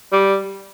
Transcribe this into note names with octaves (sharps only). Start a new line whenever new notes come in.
G3